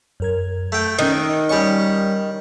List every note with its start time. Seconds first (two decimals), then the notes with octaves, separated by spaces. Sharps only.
0.20 F#2 A#4 G#6
0.72 A3 G5
0.99 D#3 C#4 F#6
1.49 G3 C#5 D#5 G#5 C#6